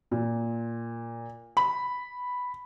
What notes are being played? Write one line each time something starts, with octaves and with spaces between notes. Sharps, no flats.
A#2
B5